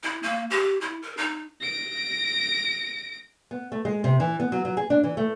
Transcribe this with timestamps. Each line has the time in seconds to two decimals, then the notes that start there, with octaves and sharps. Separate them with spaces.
0.03 E4
0.23 A#3
0.50 G4
0.81 E4
1.02 A#4
1.17 D#4
1.61 A#6 D7
3.51 B3
3.72 A3
3.85 G#3
4.04 C3
4.20 E3
4.40 B3
4.52 F#3
4.65 F#3
4.77 G#4
4.90 D4
5.04 E3
5.17 A3